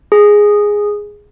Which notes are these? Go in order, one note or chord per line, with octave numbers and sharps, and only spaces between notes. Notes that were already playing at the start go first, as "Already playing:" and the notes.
G#4